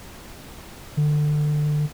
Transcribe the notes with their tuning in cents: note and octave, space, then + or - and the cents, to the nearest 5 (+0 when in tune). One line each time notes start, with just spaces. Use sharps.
D3 +25